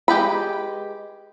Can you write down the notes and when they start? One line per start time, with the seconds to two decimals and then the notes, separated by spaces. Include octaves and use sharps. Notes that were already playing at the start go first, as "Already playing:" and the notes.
0.08 G#3 G4 B4 B5